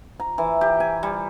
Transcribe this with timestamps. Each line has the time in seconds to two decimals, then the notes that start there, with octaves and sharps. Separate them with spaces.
0.20 A#5
0.38 E3
0.61 G4
0.80 G#5
1.03 G3